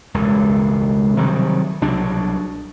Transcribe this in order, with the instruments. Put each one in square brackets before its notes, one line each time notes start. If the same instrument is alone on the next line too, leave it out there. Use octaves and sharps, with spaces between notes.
[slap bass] E1 C#2 G2
C3 D#3 F#3 G3
C2 B2 F#3 D4